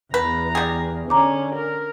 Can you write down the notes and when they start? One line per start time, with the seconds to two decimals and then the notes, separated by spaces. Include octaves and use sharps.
0.14 E2 B4 A#5
0.55 G3 G#4
1.10 D3 C#4 A#5 D6
1.55 A#4